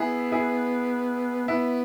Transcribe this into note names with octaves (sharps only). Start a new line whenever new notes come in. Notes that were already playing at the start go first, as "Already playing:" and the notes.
Already playing: B3 E4 G#4
E4 G#4
B3 E4